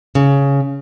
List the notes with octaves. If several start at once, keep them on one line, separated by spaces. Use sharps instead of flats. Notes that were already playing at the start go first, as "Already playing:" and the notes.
C#3